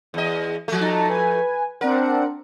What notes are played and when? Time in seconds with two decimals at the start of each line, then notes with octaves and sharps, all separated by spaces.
0.14 E2 D#5
0.68 F3 A3
0.81 D#4 A5 A#5
1.09 B4 G#5
1.81 C4 D4 A#4 F#5